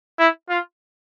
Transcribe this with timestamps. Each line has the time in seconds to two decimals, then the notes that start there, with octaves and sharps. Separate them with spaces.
0.18 E4
0.49 F4